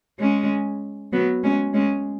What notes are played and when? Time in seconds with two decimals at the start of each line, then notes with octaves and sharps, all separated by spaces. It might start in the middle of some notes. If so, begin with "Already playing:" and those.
0.20 G#3 C#4
1.13 F#3 B3
1.43 G#3 C#4
1.74 G#3 C#4